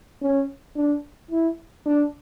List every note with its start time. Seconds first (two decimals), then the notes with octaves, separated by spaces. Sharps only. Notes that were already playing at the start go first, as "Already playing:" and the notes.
0.22 C#4
0.76 D4
1.31 E4
1.86 D4